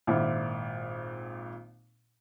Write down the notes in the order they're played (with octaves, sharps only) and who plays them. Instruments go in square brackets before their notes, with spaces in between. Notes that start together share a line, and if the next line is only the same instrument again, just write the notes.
[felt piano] G#1 A#2 E4 E5